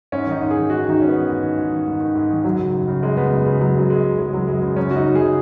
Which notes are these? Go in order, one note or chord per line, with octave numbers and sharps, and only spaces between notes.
G#2 C#4
D#3 D#4
G#2
D#3 G#4
G#2 F#4
D#3 D#4
G#2 C#4
B3
D#3
G#2
D#3
G#2
D#3
G#2
D#3
G#2
D#3
F#2 F#3
C#3
F#2
C#3
F#2 G#3
C#3 B3
F#2
C#3 G#3
F#2 F#3
C#3 F#3
F#2 G#3
C#3
F#2 G#3
C#3 F#3
F#2 G#3
C#3
F#2 C#4
C#3 F#4
D#4
F#2
C#3 G#4